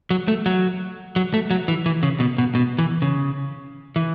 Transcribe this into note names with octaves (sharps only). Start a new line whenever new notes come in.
F#3
A3
F#3
F#3
A3
F#3
E3
E3
C#3
B2
B2
B2
E3
C#3
E3